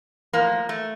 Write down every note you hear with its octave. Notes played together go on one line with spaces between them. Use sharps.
A2 F3 A#3
A3